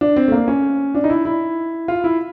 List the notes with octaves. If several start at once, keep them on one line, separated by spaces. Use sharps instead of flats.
D4
C4
A3
A#3
C#4
D4
D#4
E4
E4
F4
E4